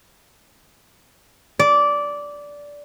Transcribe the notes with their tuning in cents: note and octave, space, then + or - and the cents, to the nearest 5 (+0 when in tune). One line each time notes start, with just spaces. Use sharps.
D5 -15